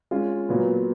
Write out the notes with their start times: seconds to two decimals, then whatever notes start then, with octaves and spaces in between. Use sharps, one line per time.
0.11 G#3 C#4 F4
0.49 A#2 F#3 B3